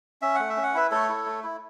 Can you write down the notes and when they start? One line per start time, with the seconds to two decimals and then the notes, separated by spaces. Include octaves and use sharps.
0.22 C#4 E5
0.35 A3 F#5
0.50 E5
0.57 C#4
0.63 F#5
0.74 E4 B4 E5
0.91 A3 A4 C#5
1.09 E4
1.26 A3
1.43 E4